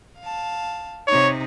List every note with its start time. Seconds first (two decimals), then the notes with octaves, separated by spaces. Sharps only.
0.21 F5 A5
1.08 C3 D#4 C#5